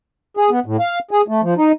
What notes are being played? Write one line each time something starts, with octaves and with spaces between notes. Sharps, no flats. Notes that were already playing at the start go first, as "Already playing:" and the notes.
G#4
B3
A2
F5
G#4
A3
F3
D#4